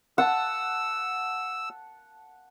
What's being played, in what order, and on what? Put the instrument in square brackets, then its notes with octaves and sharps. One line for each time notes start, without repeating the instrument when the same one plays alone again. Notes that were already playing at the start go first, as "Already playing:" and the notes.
[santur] F#5 A5 [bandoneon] E6